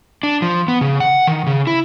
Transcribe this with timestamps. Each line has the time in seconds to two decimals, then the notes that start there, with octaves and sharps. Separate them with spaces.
0.23 D4
0.42 F3
0.68 B3
0.81 C#3
1.00 F#5
1.27 D#3
1.47 C#3
1.67 E4